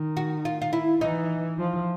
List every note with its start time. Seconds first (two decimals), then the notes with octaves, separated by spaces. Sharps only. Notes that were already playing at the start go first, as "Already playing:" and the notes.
Already playing: D#3
0.17 F#4
0.45 F4
0.62 F4
0.73 E4
1.01 E3 D#4
1.58 F3